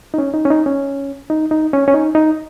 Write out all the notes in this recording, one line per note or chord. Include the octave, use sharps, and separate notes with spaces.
D#4
C#4
D#4
C#4
D#4
C#4
D#4
D#4
C#4
C#4
D#4
D#4